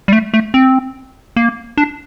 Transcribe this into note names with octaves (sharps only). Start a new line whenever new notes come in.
G3
A3
A3
C4
A#3
D4